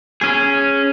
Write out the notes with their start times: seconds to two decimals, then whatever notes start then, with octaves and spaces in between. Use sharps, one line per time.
0.21 C#4 G#4